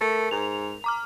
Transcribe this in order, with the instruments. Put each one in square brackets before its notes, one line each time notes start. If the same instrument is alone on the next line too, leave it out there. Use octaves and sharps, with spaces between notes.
[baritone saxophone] A3 [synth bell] A#4
[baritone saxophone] G#2 [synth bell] F7
[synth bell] A#5 D6 F6